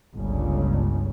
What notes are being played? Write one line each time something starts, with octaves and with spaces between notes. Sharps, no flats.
G1 C#2 C#3